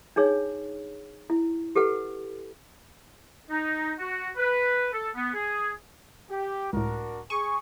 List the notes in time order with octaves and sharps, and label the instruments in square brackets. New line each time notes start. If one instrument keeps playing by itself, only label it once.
[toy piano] D4 D#4 G#4 C#5
E4
G4 A4 B4 F#5
[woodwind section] D#4
F#4
B4
A4
B3
G#4
[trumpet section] G4
[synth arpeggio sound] C#2 A2 [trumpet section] D4 F#4 A#4
[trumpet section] G#4 [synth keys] C#6 [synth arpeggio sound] D#7